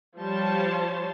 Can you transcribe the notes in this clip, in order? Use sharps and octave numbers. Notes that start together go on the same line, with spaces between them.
F3 G3 C#5 A5 C6